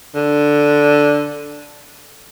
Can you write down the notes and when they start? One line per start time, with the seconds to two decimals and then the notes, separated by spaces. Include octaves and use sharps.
0.15 D3